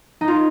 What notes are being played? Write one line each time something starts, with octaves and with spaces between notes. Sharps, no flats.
D#4
F4